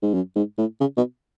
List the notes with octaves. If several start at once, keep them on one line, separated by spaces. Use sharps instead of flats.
G#2
F#2
G#2
A2
C#3
B2